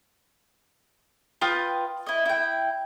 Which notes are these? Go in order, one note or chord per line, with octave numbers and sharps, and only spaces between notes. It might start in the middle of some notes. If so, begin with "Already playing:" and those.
F4 B4 G5 D#6
E4 D#5
E4 G5